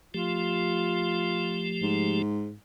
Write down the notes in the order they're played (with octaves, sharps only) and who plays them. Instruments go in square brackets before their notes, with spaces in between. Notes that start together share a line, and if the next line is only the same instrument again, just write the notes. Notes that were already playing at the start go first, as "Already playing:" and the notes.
[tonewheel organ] F3 A3 G4 [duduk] F4
[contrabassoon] G#2